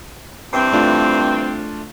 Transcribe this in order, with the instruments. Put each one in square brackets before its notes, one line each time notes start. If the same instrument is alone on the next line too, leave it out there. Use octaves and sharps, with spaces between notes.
[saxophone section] G2 E3 C4
[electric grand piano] A3 D4 F4